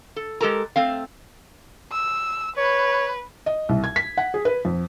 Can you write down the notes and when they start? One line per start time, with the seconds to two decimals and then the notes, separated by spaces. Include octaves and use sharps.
0.16 A4
0.41 G#3 G4 A4 A#4 A#5
0.76 A3 C4 F5
1.92 E6
2.57 B4 C#5
3.46 D#5
3.69 C2
3.84 G#6
3.96 B6
4.17 F#5
4.34 G#4
4.45 B4
4.65 F2